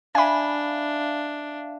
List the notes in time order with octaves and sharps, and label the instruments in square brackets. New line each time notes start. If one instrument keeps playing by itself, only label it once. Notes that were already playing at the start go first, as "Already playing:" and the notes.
[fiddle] D4 [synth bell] E5 F5 [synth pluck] G#5 B5